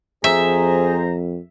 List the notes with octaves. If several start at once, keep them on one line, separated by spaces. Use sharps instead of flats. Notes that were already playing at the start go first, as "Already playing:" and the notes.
F2 G#4 C5 E5 A#5